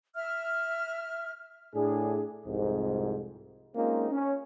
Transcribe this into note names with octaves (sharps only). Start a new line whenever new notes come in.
E5 F6
A2 D4 G#4
C2 F2 G#2
G#3 A#3 C4 C#4 D#4 F4
C#4